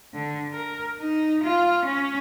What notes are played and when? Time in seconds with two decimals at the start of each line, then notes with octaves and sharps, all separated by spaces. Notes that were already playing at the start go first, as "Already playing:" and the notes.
0.13 D3
0.52 A#4
0.99 D#4
1.43 F4
1.85 C#4